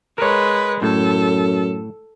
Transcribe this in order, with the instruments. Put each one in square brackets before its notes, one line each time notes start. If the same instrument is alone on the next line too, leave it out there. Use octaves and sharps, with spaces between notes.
[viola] G#3 B4 [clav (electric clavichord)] A#4 C#5
[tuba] F#2 [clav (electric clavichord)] A2 [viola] A4